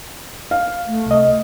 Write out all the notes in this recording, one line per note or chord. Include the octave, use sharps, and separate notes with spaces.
F5
A3
C2 D#5